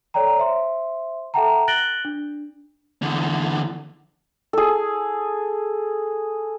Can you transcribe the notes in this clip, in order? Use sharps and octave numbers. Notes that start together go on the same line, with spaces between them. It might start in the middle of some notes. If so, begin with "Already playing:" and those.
A4 C#5 D5 G5 A#5
C5 E5 C6
A4 E5 F#5 G5 A5 A#5
F#6 A6 A#6 D7 F#7 G7
D4
E2 D3
G#4 A4